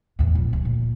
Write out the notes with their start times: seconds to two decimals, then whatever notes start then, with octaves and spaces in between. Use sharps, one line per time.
0.19 E2 A2
0.35 A#1
0.53 D2
0.65 A#2